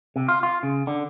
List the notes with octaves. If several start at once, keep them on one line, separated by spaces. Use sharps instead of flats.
C3
F4
F4
C#3
D3